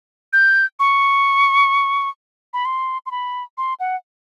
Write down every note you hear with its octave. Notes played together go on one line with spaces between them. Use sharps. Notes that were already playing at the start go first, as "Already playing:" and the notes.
G6
C#6
B5
C6
C6
B5
C6
F#5